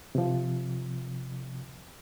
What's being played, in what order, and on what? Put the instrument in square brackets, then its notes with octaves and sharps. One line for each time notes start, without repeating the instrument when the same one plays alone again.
[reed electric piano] C3 F3